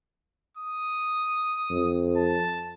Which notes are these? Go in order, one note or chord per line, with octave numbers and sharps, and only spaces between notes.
D#6
F2
A5